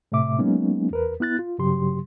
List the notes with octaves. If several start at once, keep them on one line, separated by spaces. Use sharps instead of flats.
A2 C3 A3 E5 D6
F#3 G#3 A#3 B3 C#4 D#4
E2 A#4 B4
B3 E4 F#6 A6
F4
G2 C#3 F#3 G4 C6